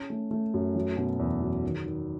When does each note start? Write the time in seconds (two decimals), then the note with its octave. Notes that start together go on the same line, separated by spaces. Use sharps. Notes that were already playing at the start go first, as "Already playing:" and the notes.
Already playing: C#4
0.10 A3
0.31 A3
0.54 F#2
0.75 F#3
0.97 B2
1.19 E2
1.42 F#3
1.64 D#3
1.86 D#3